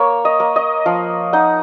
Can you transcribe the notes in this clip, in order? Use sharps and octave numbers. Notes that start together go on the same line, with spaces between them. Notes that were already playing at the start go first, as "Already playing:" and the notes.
Already playing: A#3 C#5
D#5
A#3
D#5
F3 F5
D#4 F#5